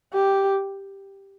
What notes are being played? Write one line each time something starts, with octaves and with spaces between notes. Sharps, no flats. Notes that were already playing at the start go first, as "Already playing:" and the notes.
G4